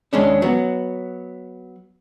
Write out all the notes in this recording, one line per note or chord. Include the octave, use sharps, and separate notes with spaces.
D#2 G#3 C#4 D4
F#3 B3